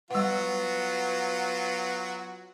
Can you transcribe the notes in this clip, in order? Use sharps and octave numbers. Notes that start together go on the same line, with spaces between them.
F#3 G3 B3 F4 F#4 F#5